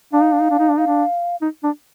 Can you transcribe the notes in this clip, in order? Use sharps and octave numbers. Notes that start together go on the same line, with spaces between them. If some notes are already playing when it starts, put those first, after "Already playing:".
D4 F5
D#4
D4
D#4
D4
D#4
D4
D#4 F5
D4
D#4
D4